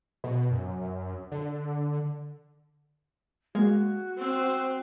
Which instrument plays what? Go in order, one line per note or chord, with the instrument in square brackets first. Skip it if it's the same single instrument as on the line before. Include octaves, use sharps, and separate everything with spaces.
[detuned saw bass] B2
F#2
D3
[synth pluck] G#3 A#3 G#6 [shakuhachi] F#4
[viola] C4 C5